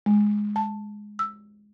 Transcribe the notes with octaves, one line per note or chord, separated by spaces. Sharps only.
G#3
A5
E6